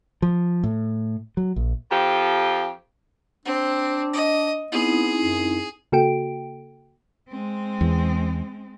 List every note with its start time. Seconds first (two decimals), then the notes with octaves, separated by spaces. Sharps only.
0.22 F3
0.63 A2
1.37 F#3
1.56 A#1
1.92 F2 F3 G4
3.45 C4 D4
4.13 D#5
4.72 B3 C4 D#4 E4 G#4
5.24 F#2
5.92 C#3 A#3 F#4 A4 G5 D7
7.29 G#3 C4
7.81 E2